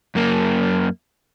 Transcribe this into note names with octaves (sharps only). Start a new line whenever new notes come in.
F#2 A#3